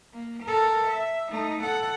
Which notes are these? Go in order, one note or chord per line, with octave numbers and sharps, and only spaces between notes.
A#3
A4 A#4
E5
A3 D#4
A4 F#5